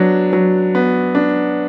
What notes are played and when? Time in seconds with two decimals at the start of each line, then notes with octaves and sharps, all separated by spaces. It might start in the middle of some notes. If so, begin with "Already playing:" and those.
Already playing: F#3 B3 D4
0.33 F#3
0.75 B3
1.15 D4